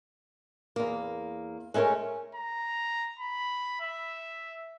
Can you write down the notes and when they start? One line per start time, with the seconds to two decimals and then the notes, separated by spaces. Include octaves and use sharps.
0.76 E2 A#3
1.74 G#3 A3 C#4 A#4 C#5
2.35 A#5
3.19 B5
3.81 E5